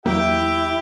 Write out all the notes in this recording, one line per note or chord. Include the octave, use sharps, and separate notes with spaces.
E2 F#3 A#3 E4 G4 E5 G5